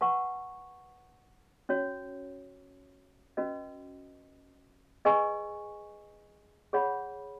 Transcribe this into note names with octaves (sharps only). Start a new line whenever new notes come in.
B4 F#5 A5 C#6
C#4 F#4 C#5
C#4 F#4 B4 D#5
G#4 B4 D#5 G#5 C#6
G#4 C#5 F#5 B5